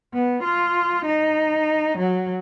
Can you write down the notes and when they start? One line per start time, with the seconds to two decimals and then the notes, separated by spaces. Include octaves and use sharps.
0.13 B3
0.44 F4
1.05 D#4
1.98 F#3